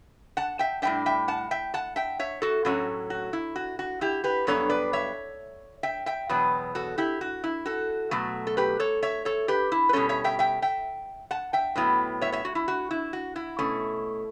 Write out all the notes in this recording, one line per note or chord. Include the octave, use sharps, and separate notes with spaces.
F#5 A5
E5 G5
A2 G3 D4 E5 G5
E5 G5
F#5 A5
E5 G5
F#5 A5
E5 G5
C#5 E5
F#4 A4
A2 F#3 A3 C#4 F#4
F#4
E4
F#4
F#4
E4 G4
G4 B4
G2 F#3 B3 D4 A4 C#5
B4 D5
C#5 E5
E5 G5
E5 G5
E2 B2 F#3 B3
F#4 A4
E4 G4
F#4
E4
F#4 A4
B2 F#3 A3
A4
G4 B4
A4 C#5
C#5 E5
A4 C#5
G4 B4
E4
B4
B2 G3 C#4 A4 C#5
C#5 E5
E5 G5
E5 G5
E5 G5
F#5 A5
E5 G5
A2 F#3 B3 E4
C#5 E5
C#5 E5
F#4
E4
F#4
E4
F#4
E4
B2 A3 C#4